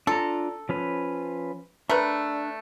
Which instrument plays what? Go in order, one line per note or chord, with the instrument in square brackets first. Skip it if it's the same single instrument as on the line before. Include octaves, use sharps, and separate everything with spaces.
[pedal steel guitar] D4 F4 A#5 [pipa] A4
[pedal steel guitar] F3 C#4 B4
[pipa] A3 A#4 B4 [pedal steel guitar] D4